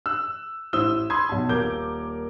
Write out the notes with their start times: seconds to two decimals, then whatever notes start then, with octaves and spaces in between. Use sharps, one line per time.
0.06 E6 F#6
0.73 A1 E4 C5 D#6 E6 G7
1.10 B5 C6 D#6 G#6
1.29 B1 A5
1.49 D#1 A#3 A#4 D6 G6 G7